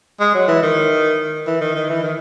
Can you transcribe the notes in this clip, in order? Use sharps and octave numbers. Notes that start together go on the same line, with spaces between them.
G#3
F#3
E3
D#3
E3
D#3
D#3
E3
D#3